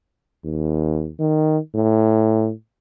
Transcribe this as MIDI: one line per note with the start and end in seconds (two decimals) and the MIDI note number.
0.44 1.10 39
1.19 1.58 51
1.75 2.51 45